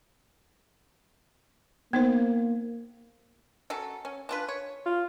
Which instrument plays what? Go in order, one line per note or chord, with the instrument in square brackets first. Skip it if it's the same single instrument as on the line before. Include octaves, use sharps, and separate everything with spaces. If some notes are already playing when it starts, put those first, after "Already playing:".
[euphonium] A#3 [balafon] B3 D#4 C5
[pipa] F#3 C#4 A4
C#4
D4 F4 B4
C#5
[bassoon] F4